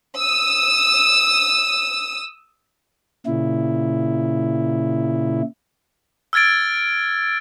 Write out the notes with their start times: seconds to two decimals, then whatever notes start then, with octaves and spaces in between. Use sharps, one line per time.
0.17 D#6 E6
3.26 A#2 C#3 E4
6.33 E6 F6 G#6 A6 D7